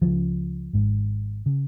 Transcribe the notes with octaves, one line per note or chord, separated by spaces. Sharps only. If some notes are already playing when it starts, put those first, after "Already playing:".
C#2 C#3 F3
G#1 G#2
C#3